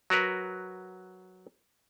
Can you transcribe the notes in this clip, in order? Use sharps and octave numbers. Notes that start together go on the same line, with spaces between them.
F#3 F#4 A#4 B4